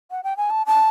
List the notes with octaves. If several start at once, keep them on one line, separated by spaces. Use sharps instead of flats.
F#5
G5
G#5
A5
A5